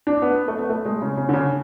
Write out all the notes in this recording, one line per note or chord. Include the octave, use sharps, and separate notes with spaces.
D4
B3
A3
B3
A3
G#3
C#3
C#3
D3
C#3